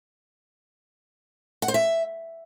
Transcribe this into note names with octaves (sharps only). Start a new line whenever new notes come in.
F#5
C5
E5